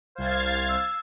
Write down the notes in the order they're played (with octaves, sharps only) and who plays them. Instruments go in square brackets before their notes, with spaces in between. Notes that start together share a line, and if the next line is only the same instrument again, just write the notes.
[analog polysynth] C2 C5 [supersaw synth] F5 G#6 A6
[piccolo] E6